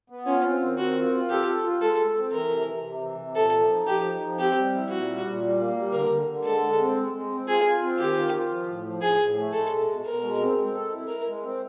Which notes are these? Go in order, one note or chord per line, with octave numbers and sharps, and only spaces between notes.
B3
C#4 F4
C4
D#3
C4 F#4
F4
F4
G4 A4
A4
F4
G#3 A4
A4
C4
E3 A#4
C3
C3
C3
E3
C3
A#2 A4
F3
D#4
F3 G4
D#4
F3
C4 G4
G3
E4
A#2 F#4
G3
A#2
G3
A#3
G3
D3 A#4
D3
D3
G#3 A4
G#3
C4
G#3
G#3
C4
F4 G#4
F4
C4
D#3 G4
F4
F4
F3
A2
F3
A2 G#4
A2
A3
G#3 A4
B2
B2
B2 A#4
G#3
C4
C4
A4
E4
E4 A#4
G#3
C4